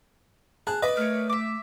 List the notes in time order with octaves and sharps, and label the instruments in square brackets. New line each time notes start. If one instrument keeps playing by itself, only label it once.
[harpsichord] G#4 [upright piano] A5 [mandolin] F#6
[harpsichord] B4 D5 B5 [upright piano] D#5
[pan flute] A3 [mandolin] A#4 C#5
[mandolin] E5 D6